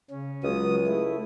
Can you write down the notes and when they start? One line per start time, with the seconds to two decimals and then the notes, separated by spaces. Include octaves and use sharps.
0.11 C#3 C#4
0.44 C#2 F#3 G#3 D#6
0.87 A3 E4